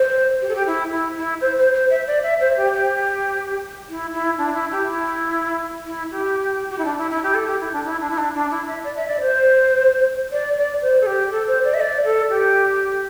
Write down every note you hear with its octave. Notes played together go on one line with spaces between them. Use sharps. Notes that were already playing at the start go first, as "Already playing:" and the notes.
Already playing: C5
G4
A4
G4
E4
E4
E4
C5
C5
C5
E5
D5
E5
C5
G4
G4
E4
E4
D4
E4
G4
E4
E4
G4
G4
E4
D4
E4
E4
G4
A4
G4
E4
D4
E4
D4
E4
D4
D4
E4
E5
D5
E5
D5
C5
D5
D5
C5
A4
G4
A4
C5
D5
E5
D5
A4
G4